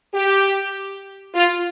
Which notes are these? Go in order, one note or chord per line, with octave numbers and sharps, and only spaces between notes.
G4
F4